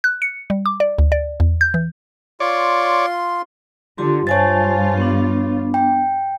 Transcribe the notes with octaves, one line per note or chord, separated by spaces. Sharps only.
F#6
C#7
G3
D6
D5
D2
D5
E2
G6
E3
F4 C#5 D5 C6
D3 F4 G4 C6
G2 F4 C5 C#5 G#5 A5 A6
B3 D4
G5